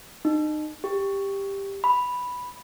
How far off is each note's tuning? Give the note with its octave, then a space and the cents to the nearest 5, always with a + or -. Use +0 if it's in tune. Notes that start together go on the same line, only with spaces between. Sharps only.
D#4 -30
G4 +10
B5 +0